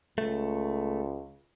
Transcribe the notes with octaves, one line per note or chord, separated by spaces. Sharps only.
C#2 A3